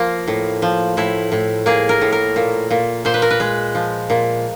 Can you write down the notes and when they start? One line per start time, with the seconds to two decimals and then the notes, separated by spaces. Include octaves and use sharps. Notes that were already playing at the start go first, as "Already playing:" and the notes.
Already playing: F3 A#3 F4
0.28 A2
0.62 F3
0.97 A2 E4
1.32 A2
1.66 A#3 G#4
1.89 A#4
2.01 A2
2.12 A#4
2.36 A#2
2.71 A#2
3.05 A#2 C5
3.14 B4
3.22 A#4
3.31 B4
3.40 G#3
3.75 F3
4.10 A#2